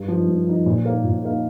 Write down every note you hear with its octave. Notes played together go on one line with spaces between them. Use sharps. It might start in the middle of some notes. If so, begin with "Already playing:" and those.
Already playing: G2
F3 D#4
G2
F3 D#4
A#2
A#3 D#4 A#4 F5
A#2
A#3 D#4 A#4 F5